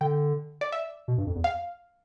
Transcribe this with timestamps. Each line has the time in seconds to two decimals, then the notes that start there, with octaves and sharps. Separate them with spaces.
0.01 D3 G5
0.61 D5
0.72 E5
1.08 B2
1.18 G2
1.27 F2
1.35 E2
1.44 F5